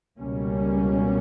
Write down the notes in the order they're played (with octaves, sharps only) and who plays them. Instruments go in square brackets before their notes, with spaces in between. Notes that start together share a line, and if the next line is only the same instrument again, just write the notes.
[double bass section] C#2 B2 G3 A#3 C#4